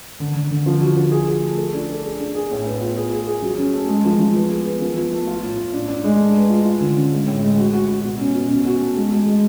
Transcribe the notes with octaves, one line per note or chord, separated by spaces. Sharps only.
D3
D3
D3
F3
F#4
F3
G#4
G#4
A3
A4
D4
A4
G#4
D4
G#4
A2
B3
F4
G#4
G#4
G#4
F#3
C#4
A3
G#3
F3
F3
B3
G#4
B3
F3
F4
A3
F4
A2
A2
D4
D4
G#3
A3
B4
F4
F4
D3
C#4
G#3
A2
G#3
F#4
F#4
F#4
B2
C#4
B2
C#4
F#4
A3
G#3
G#3
G#3